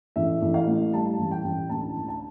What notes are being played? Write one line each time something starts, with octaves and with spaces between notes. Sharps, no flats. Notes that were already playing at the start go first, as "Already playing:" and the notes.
A1 E5
A1
F5
A2
G3 A5
A1
G5
A1
D2 A5
D2
A5